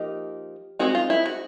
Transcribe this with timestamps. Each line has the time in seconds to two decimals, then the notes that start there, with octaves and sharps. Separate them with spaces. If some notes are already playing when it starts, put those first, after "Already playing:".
Already playing: F3 A#3 D#4 G4
0.79 G#3 C4 D#4 F#4
0.95 F4
1.10 E4
1.26 F#4